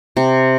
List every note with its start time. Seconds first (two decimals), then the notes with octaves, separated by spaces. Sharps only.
0.17 C3